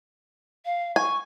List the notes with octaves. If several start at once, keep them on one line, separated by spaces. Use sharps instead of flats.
F5
G#5 C#6